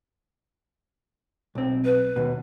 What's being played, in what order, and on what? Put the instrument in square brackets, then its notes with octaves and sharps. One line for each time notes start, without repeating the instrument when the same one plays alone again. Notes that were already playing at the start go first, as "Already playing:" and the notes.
[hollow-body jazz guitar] B1 C4
[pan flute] B4
[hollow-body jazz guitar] D#2 B2